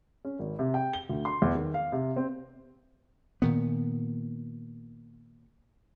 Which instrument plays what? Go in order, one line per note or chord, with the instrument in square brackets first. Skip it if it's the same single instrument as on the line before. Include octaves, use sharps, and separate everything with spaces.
[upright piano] C#4
G#1
C3
G5
G7
D2
C6
E2
D#3
F5
C3
C4
[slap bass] A#2 D#3 B3